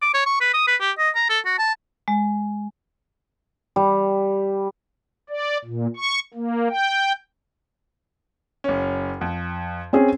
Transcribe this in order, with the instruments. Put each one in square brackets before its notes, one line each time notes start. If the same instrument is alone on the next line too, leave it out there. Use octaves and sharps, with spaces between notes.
[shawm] D6
C#5
C#6
B4
D#6
B4
G4
D#5
A#5
A4
F#4
A5
[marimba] G#3
[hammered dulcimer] G3
[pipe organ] D5
A#2
C#6
A#3
G5
[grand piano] F#1 C#4
F2
[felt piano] C4 C#4 G#4